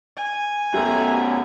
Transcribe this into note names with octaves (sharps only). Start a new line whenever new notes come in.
G#5
F#2 B2 G4 A4 E5 A#5